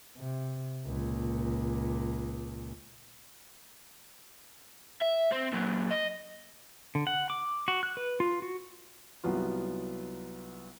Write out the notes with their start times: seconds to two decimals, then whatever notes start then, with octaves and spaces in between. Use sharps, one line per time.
0.18 C3
0.87 C#2 A#2
5.01 E5
5.32 C4
5.53 A#2 F#3
5.91 D#5
6.95 D3
7.07 F#5
7.30 D6
7.68 F#4
7.83 F#6
7.97 B4
8.20 F4
8.42 F#4
9.24 C2 F#3 B3 F4